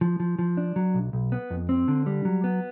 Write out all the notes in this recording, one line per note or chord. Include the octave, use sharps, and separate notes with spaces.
F3
F3
F3
D4
F#3
B1
B1
B3
F2
C4
D3
G3
F#3
B3